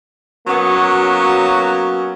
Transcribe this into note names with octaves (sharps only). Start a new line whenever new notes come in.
F#3 A#3 B3 C#4 F#4